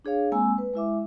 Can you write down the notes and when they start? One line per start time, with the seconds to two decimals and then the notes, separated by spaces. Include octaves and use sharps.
0.05 D4 G#4 C#5 F5
0.32 G#3 A#3 C4 G#5 E6
0.58 B4
0.74 G#3 E4 E5 D6